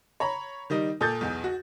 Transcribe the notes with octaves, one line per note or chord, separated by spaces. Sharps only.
C#5 A#5 B5
D#3 G3 D#4
A#2 A4 D#6 G6 A6
B1 E2
F#4